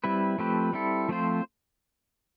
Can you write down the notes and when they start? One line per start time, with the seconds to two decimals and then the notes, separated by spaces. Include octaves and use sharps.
0.04 G3 C4 E4 B4
0.38 F3 A3 C4 G4 B4
0.73 G3 C4 E4 A4
1.08 F3 A3 C4 F4 C5